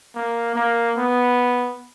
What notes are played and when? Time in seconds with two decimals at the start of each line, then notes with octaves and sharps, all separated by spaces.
0.15 A#3
0.55 A#3
0.97 B3